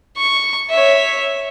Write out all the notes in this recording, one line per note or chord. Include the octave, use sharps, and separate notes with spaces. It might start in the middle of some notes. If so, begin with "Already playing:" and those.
C#6
C#5 E5